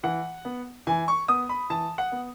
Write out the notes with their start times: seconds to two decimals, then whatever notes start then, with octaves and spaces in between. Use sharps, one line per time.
0.03 E3 F#5
0.45 B3
0.87 E3 G#5
1.08 C#6
1.28 B3 D#6
1.49 B5
1.70 E3 A5
1.98 F#5
2.12 B3